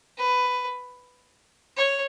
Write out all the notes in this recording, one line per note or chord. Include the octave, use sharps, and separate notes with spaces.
B4
C#5